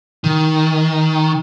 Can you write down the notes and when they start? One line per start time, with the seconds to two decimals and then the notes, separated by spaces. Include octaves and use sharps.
0.24 D#3